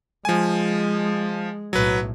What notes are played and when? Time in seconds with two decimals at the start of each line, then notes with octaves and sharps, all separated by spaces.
0.25 F3 G#3 G#5
1.73 B1 A2 F#3 B4